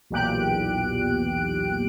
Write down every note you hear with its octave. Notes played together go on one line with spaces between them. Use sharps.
B1 E2 A#2 G4 F#6 D7